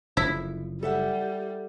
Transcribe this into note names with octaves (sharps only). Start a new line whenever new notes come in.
F#1 D3 F3 E4
G3 A4 E5 F#5